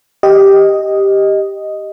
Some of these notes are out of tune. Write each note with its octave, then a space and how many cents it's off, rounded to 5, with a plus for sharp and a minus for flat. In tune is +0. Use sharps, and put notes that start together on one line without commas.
G4 +0 D#5 +0